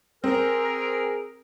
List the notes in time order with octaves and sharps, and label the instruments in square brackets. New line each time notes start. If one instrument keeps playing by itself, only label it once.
[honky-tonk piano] C4 [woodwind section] G#4 A#4